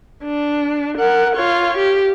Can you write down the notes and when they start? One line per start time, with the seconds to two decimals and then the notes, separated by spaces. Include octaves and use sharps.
0.23 D4
0.97 A#4 F#5
1.36 F4 C#5
1.77 G4